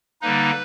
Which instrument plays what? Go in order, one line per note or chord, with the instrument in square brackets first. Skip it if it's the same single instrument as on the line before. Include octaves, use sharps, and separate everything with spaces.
[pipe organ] D3 G3 A#3 D#4 B4